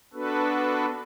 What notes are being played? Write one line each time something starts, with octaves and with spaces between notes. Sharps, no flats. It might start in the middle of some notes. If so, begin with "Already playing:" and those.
B3 D4 F#4 A4 B4